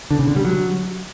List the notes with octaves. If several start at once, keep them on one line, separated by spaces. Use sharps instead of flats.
D3
C#3
D3
G3
F#3